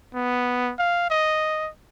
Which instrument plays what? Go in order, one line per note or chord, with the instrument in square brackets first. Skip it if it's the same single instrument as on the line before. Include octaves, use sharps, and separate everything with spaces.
[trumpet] B3
F5
D#5